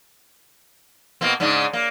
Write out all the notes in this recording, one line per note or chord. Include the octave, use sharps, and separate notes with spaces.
B2 A#3 C4
G#2 C#3 D4
A#3